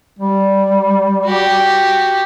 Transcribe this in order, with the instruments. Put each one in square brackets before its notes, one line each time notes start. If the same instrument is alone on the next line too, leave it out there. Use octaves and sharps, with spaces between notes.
[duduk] G3
[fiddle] F#4 G4